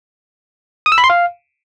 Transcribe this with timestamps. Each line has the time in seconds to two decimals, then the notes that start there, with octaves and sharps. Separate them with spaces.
0.86 D#6
0.92 E6
0.98 B5
1.04 C6
1.10 F5